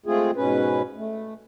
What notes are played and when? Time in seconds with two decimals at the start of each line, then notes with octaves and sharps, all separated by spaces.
0.06 G#3 A3 C4 F4 G#4
0.36 G#2 B2 C#4 B4
0.96 A3